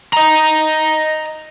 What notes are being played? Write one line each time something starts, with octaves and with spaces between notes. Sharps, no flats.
D#5 A#5